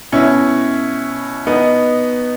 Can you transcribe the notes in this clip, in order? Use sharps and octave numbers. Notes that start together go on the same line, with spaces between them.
B2 C#4 E4
B3 D#4